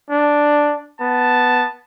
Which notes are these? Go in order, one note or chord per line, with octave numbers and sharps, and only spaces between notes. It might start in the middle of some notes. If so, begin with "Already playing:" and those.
D4
B3 A5